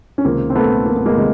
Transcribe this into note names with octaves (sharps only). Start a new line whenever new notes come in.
C#4
C#2 C3 D#3 A#3 C4
C4
A3 B3
A#3
B3
G#3 A#3
C3 D#3 G#3